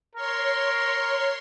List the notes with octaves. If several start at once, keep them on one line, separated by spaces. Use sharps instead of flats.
A#4 C#5 C6